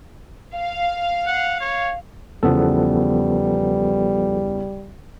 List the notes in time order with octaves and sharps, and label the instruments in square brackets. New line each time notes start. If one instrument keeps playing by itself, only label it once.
[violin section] F5
[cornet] F#5
C#5
[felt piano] E2 C#3 [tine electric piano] F3 B3 A4 [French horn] G3